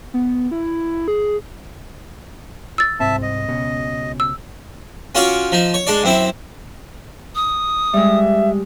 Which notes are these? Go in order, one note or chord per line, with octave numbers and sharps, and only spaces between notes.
B3
E4
G#4
E6 A6
C2 G#2 C4 E5 A5
D#5
C#2 B2 C#4
E6
C#4 F4 F#4 C#5 F5 D6
F3 D#4
C#5
G#3 D4 D5
F#2 C4 E4
D#6
G3 G#3 E5